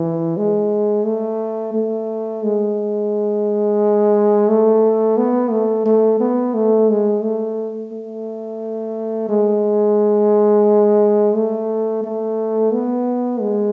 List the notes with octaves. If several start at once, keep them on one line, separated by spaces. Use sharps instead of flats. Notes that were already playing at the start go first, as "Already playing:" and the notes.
Already playing: E3
G#3
A3
A3
G#3
A3
B3
A3
A3
B3
A3
G#3
A3
A3
G#3
A3
A3
B3
G#3